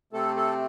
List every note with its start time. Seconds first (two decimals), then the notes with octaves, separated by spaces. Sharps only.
0.13 C3 A3 C4 A4
0.36 A4